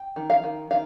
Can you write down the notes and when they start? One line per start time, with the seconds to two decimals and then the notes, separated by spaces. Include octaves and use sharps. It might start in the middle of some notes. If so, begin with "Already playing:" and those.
Already playing: G5
0.16 D#3
0.30 F5
0.44 D#3
0.71 D#3 F5